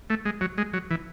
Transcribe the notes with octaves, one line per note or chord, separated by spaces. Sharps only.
A3
G#3
F#3
G#3
F#3
E3